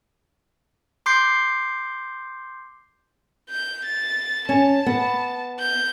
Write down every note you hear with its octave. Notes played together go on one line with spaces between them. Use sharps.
C6 D6 G6 C7
G6
A6
C#4 A5
B3
G6